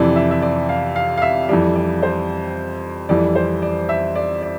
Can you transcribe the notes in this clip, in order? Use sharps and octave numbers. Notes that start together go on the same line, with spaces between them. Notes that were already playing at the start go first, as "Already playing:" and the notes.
Already playing: F2 C3 E3 D5
E5
E5
D5
F5
F5
F5
E5
F2 E3 G3 D5
D5
C5
F2 E3 G3 D5
C5
D5
E5
D5
D5